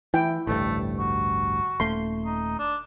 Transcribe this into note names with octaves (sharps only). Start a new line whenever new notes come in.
E3 E4 G5
A1 D2 G2 A3
F#4
D#1 A3 C6
D#4
D4